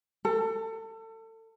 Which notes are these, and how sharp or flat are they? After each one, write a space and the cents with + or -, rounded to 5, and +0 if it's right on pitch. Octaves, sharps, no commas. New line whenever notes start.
A4 +30